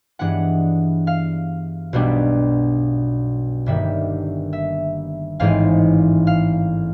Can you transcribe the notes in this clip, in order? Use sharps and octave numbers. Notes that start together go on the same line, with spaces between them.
G2 E3 G#3 B3 D4 F#5
F5
B1 B2 G3 B3 D4
G1 G2 D#3 G3 A#3 E5
E5
A1 G#2 E3 G#3 C4 F5
F5